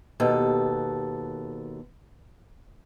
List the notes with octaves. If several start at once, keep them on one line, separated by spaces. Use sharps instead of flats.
D#2 B2 A4